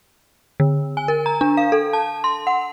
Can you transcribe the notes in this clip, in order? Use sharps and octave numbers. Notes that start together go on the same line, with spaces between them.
D3
G#5
A#4
A#5
D4
F5
A4
A5
C6
F#5